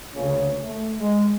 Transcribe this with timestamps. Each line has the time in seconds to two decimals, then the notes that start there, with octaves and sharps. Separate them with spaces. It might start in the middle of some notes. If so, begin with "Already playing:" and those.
0.14 D2 C#3 A#3 C#4
0.63 A3
1.00 G#3